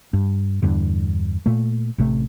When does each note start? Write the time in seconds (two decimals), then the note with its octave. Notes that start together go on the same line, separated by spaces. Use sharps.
0.13 G2
0.62 E2 G2 D3
1.46 A#2 A3
1.98 A1 C3 A3